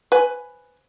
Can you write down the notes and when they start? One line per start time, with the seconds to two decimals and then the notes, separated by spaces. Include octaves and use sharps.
0.12 B4 G#5